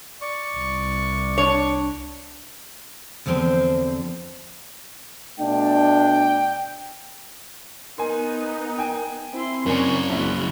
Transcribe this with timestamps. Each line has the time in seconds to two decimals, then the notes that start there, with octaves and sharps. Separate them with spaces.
0.21 D5 C#6
0.56 C2
1.38 D4 C#5
3.26 E2 D3 F3 C4 C5 D5
5.40 B2 A3 D4 G5
7.98 B3 D#4 A#4 G#5 C6
8.78 G5 G#5
9.33 C4 E4 C6
9.66 F#2 C#3 A#4 C#5 D5 G#5
10.10 A#1 G#3 E4 F#4